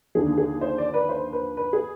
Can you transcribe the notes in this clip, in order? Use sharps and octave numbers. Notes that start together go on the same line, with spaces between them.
D#2 D3 F3 G#4
G#4
C5
D5
B4
C5
B4
B4
G#4